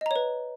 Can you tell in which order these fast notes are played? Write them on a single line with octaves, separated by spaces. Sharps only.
D#5 A#5 C#5 B4